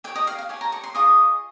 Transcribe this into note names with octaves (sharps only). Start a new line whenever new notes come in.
G4 C#5 G5
D#5
F5
F5
G4 C#5 G#5
A#5
C#6
C6
F4 G#4 D#5 C#6